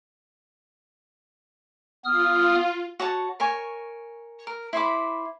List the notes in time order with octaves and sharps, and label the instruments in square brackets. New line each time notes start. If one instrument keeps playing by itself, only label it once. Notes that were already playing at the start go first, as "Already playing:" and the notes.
[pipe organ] B3 D#6 F6 [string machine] F4
[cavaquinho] F#4 C#5 A5
A#4 C#5 G#5 C#6
A#4
E4 C5 B5 D6